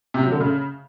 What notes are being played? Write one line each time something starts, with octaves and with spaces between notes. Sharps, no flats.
C3
F#3
D3
C#3